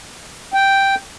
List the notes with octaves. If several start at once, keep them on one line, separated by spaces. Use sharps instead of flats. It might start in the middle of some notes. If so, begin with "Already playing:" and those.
G5